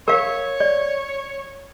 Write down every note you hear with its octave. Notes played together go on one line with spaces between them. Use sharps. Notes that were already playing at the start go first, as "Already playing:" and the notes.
A#4 C#5 F5
D5